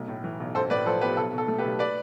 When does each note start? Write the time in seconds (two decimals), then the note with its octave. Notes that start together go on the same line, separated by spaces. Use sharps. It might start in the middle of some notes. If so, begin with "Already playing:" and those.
Already playing: B1 A3
0.08 A2
0.24 E3
0.40 B1
0.55 A1 A4 C5
0.70 A2 B4 D5
0.86 F3 A4 C5
1.01 B3 G4 B4
1.17 B1 A4
1.33 B2
1.38 A4
1.48 A3
1.58 G4 B4
1.64 B1
1.79 B4 D5